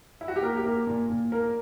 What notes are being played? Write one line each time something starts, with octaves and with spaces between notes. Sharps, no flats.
E4
F#4
G4
A#3 A#4
G4
A#3 A#4
A#2
A#2
A#3 A#4